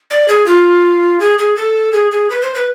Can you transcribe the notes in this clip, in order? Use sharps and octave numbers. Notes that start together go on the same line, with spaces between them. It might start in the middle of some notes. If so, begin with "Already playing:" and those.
D5
G#4
F4
G#4
G#4
A4
G#4
G#4
B4
C5
B4